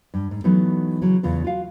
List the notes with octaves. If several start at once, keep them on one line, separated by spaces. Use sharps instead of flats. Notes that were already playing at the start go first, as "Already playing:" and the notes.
G2
G#2
E3 F#3 A3 B3 D#4
C#3 E3 F#3
E2 C#3 F4 B4
F4 F#4 F5